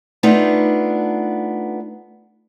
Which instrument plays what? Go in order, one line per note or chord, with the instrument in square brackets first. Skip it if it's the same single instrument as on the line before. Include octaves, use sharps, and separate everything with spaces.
[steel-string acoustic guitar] A3 B3 D4 D#4 F4